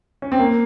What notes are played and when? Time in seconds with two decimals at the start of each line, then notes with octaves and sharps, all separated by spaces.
0.22 C#4
0.32 C4
0.39 A#3